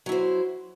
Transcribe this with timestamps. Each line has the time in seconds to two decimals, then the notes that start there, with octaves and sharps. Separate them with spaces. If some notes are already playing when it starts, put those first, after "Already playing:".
0.06 F#3
0.09 E4
0.12 C5